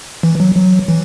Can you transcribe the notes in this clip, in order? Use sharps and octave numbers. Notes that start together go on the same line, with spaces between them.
E3
F#3
F#3
E3